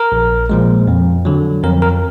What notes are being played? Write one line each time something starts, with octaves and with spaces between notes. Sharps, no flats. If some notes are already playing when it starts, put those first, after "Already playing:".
Already playing: A#4
A#1
A#2 F3 G#3
F2
D3 F#3
F2 A#4
A#4